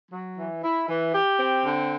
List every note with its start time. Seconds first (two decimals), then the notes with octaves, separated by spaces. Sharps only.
0.12 F#3
0.37 E3
0.63 E4
0.88 E3
1.14 G4
1.39 C4
1.64 D3